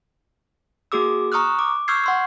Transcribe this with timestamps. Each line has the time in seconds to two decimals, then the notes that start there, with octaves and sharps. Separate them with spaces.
0.92 A#3 F#4 G#4 D6 E6
1.32 A#5 C#6 D#6 F6 F#6
1.59 D6
1.88 C#6 E6 F6 G6 G#6 C7
2.04 F#5 C6 E6